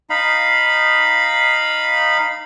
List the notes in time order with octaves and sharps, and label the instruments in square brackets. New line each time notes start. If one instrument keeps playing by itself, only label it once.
[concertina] D#4 F5 B5